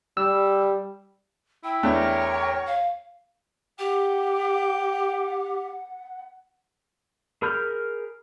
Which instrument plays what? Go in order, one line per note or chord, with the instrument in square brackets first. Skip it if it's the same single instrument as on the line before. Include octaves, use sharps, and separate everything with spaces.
[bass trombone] G3 [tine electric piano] E6
[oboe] E4 [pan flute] G5
[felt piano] E2 A3 D4 [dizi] C#5
[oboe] A#4
[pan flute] F5
[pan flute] G4 [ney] F#5 [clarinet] G5
[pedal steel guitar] G#4 A#4 B5 F6 G6